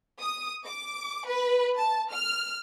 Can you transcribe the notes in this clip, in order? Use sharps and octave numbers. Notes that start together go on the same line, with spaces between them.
D#6
D6
B4
A5
F6